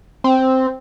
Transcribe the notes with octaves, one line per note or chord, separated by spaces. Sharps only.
C4